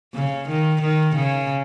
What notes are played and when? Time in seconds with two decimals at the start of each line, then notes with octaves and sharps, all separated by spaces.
0.14 C#3
0.48 D#3
0.81 D#3
1.15 C#3